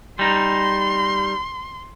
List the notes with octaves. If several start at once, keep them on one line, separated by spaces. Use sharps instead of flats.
G3 D#4 C6